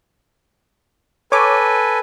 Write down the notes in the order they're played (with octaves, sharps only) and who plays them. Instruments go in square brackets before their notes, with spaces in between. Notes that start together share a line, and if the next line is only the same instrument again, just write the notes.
[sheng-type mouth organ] A4 B4 G#5 [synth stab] C#5 D6